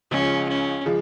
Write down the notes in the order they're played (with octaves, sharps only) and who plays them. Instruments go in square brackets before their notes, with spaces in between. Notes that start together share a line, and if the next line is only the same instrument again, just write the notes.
[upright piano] C#2 C#3 F3 G#3 [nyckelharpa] C#4
[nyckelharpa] C#4
[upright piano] C#3 F3 G#3